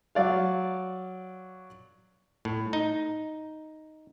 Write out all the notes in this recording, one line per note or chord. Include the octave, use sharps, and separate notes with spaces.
F#3 D5 F5
A2
D#4